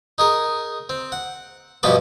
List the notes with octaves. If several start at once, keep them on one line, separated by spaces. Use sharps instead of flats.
D#4 G#4 A#4
C4
F#5
G2 B2 F3 B3 B4 D6